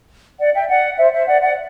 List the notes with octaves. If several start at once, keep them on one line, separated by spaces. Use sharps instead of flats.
D5 F#5
E5 G5
D5 F#5
C5 E5
C5 E5
D5 F#5
D5 F#5